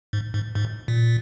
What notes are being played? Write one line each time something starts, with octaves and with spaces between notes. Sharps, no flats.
G#2
G#2
G#2
A#2